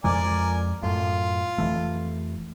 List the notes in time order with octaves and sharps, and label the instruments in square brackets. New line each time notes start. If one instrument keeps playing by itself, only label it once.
[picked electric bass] F2 F3 G#3 [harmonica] A#4 D5 G#5
[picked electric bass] F#2 A2 [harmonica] F4
[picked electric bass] F1 E3 A3